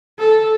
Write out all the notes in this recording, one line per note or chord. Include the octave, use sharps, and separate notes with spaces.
A4